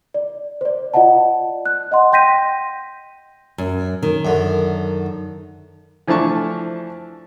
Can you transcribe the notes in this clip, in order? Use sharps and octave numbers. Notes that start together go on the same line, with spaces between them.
D5
C5 D5
F4 D5 D#5 F#5 A5
F#6
D#5 F#5 C6
G5 C6 G6 A#6 B6 D#7
F#2
D#3
F#2 D3
E3 F3 A3 D4 A5 C#6